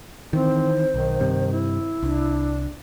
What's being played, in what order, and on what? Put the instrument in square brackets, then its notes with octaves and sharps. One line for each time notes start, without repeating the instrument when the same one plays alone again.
[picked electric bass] D#3 E3 [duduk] C4 [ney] C5
[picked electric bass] B1 [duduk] D#3
[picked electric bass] G2 C3
[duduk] E4
[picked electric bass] C2 [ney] D4